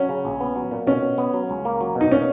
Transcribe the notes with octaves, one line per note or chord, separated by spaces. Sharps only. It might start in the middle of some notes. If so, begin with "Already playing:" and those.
Already playing: F#3 C#4
C#3
A#1
B3
F#3
A#2
B2 C#4
B2
B3
F#3
C#2
A#3
F#3
B2
D#4
A#2 C#4